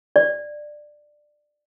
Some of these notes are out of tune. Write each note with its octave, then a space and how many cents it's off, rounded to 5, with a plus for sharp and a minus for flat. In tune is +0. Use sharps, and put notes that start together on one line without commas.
D5 +15